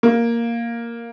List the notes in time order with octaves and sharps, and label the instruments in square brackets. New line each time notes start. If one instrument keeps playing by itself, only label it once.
[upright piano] A#3